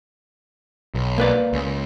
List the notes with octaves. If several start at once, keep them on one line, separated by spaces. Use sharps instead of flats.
B1
A#3 B4 D5
C#2